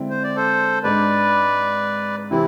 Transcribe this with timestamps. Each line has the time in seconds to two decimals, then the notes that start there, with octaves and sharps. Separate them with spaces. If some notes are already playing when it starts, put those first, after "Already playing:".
Already playing: D3 G#3 C4 E4
0.10 C5
0.23 D5
0.36 A4 C5
0.83 G#2 G#3 D4 B4 D5
2.30 C3 E3 C4 E4